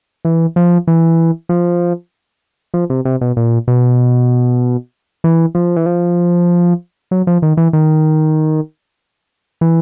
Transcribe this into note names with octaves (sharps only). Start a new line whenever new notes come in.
E3
F3
E3
F3
F3
C3
C3
B2
A#2
B2
E3
F3
E3
F3
F#3
F3
D#3
E3
D#3
E3